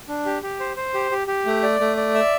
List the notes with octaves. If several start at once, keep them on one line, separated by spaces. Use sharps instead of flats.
D4
G4
G4
C5
C5
G4
G4
G4
A3
D5
A3
D5
E5